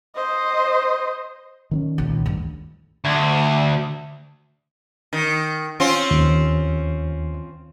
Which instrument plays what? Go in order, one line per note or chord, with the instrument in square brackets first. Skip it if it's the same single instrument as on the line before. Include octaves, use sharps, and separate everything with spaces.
[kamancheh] C5 D#5
[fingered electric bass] D#3 C4 C#4
[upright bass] C#2 A#2
D2 G2
[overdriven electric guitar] D2
[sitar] D#3
C4 C#4 F4
[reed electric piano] D#2